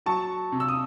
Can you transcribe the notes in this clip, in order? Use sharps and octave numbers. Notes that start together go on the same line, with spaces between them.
F#3 A5 C#6
C3
E6
D#6